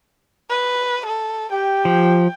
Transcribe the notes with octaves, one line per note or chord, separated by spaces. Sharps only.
B4
A4
G4 G5
F3